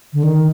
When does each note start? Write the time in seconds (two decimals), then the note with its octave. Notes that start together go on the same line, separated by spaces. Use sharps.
0.13 D3
0.23 D#3